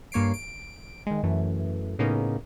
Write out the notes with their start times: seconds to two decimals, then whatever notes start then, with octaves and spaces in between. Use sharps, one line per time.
0.12 G2 A#3 C#5 C7 D7
0.34 D7
1.07 D#3 G#3
1.23 F#2 E3 A3
1.99 A2 C#3 A#3 B3 C#4 D#4